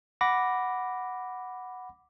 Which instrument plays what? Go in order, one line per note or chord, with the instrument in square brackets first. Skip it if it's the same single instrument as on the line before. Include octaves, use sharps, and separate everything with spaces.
[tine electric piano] F#5 B5 D6 A#6